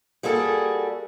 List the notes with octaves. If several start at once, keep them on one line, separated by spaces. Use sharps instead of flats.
G3 A#3 F#4 G#4 A4